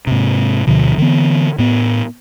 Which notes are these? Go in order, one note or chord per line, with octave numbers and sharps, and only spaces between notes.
G#2 C3
D2 B2 D3 F3
D3 E3 B3
A2 B3